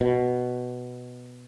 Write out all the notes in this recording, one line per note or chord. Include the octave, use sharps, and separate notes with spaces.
B2